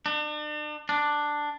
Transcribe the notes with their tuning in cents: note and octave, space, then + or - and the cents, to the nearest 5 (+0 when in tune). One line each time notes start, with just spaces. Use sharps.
D4 +40
D4 +5